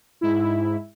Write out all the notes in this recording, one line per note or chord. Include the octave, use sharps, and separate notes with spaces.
G#2 E4